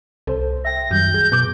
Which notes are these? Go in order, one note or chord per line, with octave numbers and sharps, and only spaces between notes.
C2 A4 C5
E5 G5 A#6
F#2 D#3 G3 G6
G#4
F#2 B2 D6